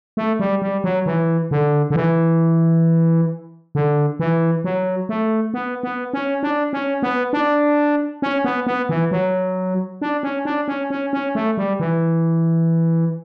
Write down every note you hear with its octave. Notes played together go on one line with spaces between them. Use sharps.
A3
G3
G3
F#3
E3
D3
D3
E3
D3
E3
F#3
A3
B3
B3
C#4
D4
C#4
B3
D4
C#4
B3
B3
E3
F#3
D4
C#4
D4
C#4
C#4
C#4
A3
G3
E3